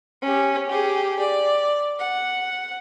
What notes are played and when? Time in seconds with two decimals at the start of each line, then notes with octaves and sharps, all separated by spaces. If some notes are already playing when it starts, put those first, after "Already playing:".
0.22 C#4 G4
0.69 G4 G#4
1.19 D5
1.99 F#5